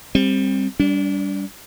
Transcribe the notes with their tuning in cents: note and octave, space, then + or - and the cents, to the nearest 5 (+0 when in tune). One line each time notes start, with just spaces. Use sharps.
G3 +15 C4 +20
G3 +0 D4 -35